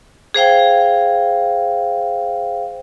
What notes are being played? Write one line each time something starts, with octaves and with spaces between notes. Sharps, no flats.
G#4 C5 F5 G5